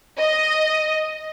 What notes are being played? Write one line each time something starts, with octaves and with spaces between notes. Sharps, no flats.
D#5